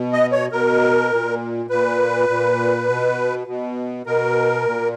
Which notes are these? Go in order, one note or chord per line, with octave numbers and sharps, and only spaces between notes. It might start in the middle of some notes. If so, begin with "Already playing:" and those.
Already playing: B2
D#5
C#5
B2 A#4
A#2
A#2 B4
A#2
B2
B2
B2 A#4
A#2